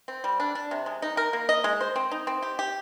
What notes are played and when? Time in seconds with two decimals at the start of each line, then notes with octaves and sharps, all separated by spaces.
0.08 C4
0.24 G3
0.40 D4
0.55 D4
0.71 C3
0.86 G#3
1.02 D#4
1.17 A#4
1.33 A#3
1.49 D#5
1.64 G#3
1.81 C5
1.96 C4
2.11 D#4
2.27 C4
2.42 G4
2.59 G4